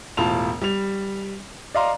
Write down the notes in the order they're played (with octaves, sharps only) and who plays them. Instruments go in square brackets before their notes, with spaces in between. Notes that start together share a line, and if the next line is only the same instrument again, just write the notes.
[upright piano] E1 A2 F4 A5 F7
G3 F7
D5 D#5 F5 A#5 C6